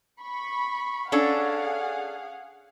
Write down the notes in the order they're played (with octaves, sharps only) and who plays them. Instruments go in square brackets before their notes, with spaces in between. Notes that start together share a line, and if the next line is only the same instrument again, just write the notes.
[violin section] B5 C#6
[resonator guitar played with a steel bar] C#4 D4 A4 [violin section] G#4 F5 F#5